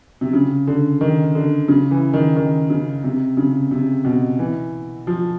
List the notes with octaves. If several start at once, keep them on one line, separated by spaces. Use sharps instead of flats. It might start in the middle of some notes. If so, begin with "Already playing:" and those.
C3
C#3
D3
D#3
D3
C#3
E3
D#3
D#3
C#3
C3
C#3
C3
B2
E3
F3